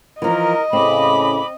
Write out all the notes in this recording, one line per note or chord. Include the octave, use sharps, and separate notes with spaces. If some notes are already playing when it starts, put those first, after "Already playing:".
E3 F3 A#4 D#5
A2 C#3 C4 B5 D6